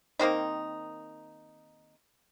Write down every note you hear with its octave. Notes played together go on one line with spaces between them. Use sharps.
D#3 A#3 C4 D#4